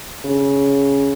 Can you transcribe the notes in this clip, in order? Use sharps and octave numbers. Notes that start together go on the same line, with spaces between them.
C#3